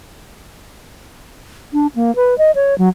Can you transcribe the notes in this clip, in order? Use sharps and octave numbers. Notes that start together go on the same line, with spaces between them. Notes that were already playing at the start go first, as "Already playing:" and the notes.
D4
A#3
B4
D#5
C#5
F#3